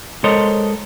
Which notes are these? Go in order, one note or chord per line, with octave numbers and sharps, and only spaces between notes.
G#3 A4 A#4 C5 C#5 D#5